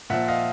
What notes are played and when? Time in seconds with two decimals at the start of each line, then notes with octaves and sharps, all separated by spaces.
0.10 A#2 F3 E5 F#5
0.28 D#5 F5